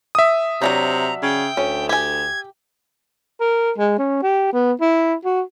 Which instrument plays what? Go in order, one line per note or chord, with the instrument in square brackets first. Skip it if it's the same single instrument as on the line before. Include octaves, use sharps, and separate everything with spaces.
[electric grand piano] E5 D#6
[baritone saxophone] C3 [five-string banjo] F#3 D4 C#5 [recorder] A#5
[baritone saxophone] C#3 [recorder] G5
[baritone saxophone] D2 [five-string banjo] C#4
[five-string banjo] G4 G#5 [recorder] G#6
[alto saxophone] A#4
G#3
C#4
G4
B3
E4
F#4